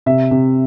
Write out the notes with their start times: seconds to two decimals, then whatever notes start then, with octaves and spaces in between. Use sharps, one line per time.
0.06 C3 E5
0.31 C3